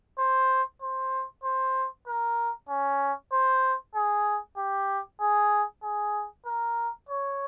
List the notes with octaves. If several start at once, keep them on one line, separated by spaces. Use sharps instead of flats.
C5
C5
C5
A#4
C#4
C5
G#4
G4
G#4
G#4
A#4
C#5